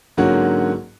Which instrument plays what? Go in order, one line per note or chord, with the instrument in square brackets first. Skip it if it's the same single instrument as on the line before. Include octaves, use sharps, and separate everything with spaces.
[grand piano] G#2 D3 F#3 A#3 C#4 F#4